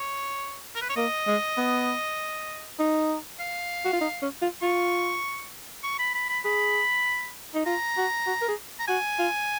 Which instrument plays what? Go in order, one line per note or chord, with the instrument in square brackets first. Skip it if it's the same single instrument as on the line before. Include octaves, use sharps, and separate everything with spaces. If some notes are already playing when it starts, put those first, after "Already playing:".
Already playing: [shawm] C#5
A#4
B4
C#5
[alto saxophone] A#3 [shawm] D#5
[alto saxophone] G#3
B3
D#4
[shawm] F5
[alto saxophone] F#4
F4
D#4
C#4
F4
[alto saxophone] F4 [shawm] C#6
[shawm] C#6
B5
B5
B5
[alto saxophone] G#4 [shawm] B5
[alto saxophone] D#4
[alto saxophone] F4 [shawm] A#5
[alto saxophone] F#4
F#4
A#4
G#4
[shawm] A#5
[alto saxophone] F#4 [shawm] G#5
[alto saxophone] F4